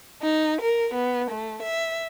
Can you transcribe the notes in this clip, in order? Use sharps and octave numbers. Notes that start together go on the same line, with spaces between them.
D#4
A#4
B3
A3
E5